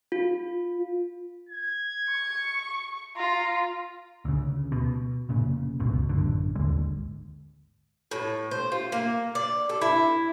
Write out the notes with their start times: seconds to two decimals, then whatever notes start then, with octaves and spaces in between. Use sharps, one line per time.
0.12 F4
1.49 G#6
2.09 C#6
3.17 F4 A#5
4.25 D2 C#3
4.72 B2
5.29 F1 A#2 C#3
5.80 F#1 C#2 G#2 B2
6.09 A1 F#2 D3
6.55 G#1 D#2 D3 G#3
8.11 A2
8.51 C5
8.72 F4
8.92 A#3
9.35 D5
9.69 A4
9.81 E4